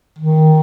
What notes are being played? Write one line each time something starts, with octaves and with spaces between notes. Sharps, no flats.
D#3